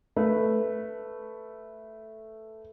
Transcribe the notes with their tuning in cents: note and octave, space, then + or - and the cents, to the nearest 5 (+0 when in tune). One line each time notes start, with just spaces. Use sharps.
A3 +0 B4 +0